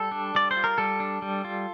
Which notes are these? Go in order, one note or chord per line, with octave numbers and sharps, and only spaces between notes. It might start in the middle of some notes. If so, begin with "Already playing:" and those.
Already playing: G3 A4
D4
G3 D5
C5
F4
A#4
G3 A4
D4
G3
F4